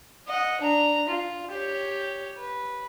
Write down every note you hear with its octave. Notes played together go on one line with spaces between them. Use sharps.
D#5 F#5
D4 A#5
F4
G4 C#5
B4